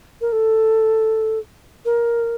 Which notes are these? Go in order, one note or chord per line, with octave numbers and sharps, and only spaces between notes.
A#4
A4
A#4